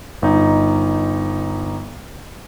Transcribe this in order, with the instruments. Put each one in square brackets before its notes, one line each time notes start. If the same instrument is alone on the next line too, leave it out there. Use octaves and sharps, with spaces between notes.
[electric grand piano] G1 D#4